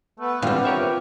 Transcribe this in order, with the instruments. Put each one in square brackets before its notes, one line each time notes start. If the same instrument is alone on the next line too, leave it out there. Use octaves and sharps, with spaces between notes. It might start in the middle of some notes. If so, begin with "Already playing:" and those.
[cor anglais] A3 [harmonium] B3 B4
[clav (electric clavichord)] G#1 E2 G2 [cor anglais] G3 [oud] C4 F4
[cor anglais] G4 [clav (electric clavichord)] A#4 C#5 E5